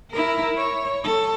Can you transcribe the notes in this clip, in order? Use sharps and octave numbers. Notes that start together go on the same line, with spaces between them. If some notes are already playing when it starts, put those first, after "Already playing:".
E4 A#4
C#5
A4